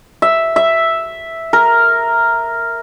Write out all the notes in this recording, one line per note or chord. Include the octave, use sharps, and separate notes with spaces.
E5
E5
A#4